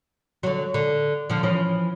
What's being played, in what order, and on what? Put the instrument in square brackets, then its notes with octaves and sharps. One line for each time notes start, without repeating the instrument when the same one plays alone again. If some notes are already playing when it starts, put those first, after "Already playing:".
[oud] D3 F#3
D3
D3 F3
E3 F3 C#4